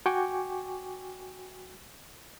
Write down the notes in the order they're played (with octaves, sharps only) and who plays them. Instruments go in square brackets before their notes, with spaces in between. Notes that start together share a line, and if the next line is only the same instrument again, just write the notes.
[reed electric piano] F#4 G5 G#5 C#6 D6